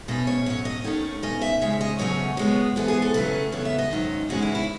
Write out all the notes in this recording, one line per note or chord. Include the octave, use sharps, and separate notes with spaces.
B2 A3 C#4 D#5
C#5
A2 F#3 C#4 C#5
D#5
D#2 D#3 A3 C#4 C#5
B2 A3 C#4 D#5
E5
C#3 G#3 C#4 E5
D#5
E2 C#3 F#3 A3 C#4 C#5
B2 G#3 B3
G#2 E3 B3 A4
G#4
A4
C#3 F#3 A3 C#4 B4
C#3 E3 B3 C#5
E5
D#5
G#2 D#3 F#3 C#4
C#3 E3 G#3 C#4 F#4
E4
E4